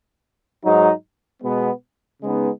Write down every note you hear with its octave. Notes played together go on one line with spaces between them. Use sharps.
G#2 F#3 D#4
B2 G#3 B3
C#3 G#3 B3 D#4